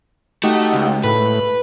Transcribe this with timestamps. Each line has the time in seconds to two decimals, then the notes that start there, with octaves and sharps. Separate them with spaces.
0.44 A3 D#4 F#4 G4
0.72 C#2
1.04 A2 B4